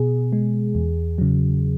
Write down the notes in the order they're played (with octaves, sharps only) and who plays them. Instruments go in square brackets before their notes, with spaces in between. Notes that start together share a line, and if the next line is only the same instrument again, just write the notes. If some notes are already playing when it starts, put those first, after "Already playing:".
Already playing: [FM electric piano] B2 G#4
G#3
E2
C#3 F#3